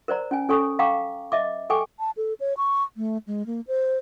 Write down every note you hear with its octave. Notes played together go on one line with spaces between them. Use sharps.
A#4 C5 D5 A#5
C#4 G#5
C#4 A4 C#5 G#5 C#6 D#6
F5 G5 A#5 C#6 D6
D#5 E5 D6
A4 G5 G#5 C#6 D6
A5
A4
C#5
C#6
A3
G#3
A#3
C5